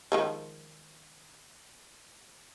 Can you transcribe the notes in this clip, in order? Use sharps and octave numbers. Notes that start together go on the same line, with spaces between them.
D#3 F3 G#3